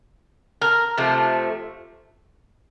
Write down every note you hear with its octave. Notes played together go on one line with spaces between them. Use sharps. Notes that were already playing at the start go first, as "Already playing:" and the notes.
A#4
C3 F3 A3